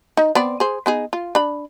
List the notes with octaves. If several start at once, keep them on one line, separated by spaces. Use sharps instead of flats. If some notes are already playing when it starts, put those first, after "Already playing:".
D#4
B3 C4 D5
G#4 C5
B3 D#4 G#4
F4
D4 B5